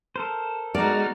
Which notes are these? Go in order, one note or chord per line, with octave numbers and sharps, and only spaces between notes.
A4 A#4 C5
G#3 B3 D#4 F#4 D5 F6